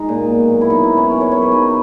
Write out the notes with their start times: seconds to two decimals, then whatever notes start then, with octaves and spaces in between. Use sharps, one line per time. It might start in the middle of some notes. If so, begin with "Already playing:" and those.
Already playing: G#3 D#4
0.09 A#2
0.29 B2
0.49 F#3
0.61 E4
0.70 F#3 D#4
0.83 E4
0.91 B2
0.97 C#4
1.11 G#2 A#4
1.21 C#5
1.31 F#3 C#5
1.42 B4
1.52 F#3 D#4